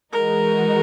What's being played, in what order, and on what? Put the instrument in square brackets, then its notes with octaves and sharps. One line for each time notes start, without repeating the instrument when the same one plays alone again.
[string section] E3 G#3 D#4 F#4 [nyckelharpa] A#4